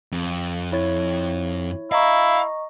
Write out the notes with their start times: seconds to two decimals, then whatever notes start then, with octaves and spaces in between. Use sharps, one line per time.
0.12 F2
0.72 E4 C#5 A6
1.92 E4 D#5 F5 A#5 C#6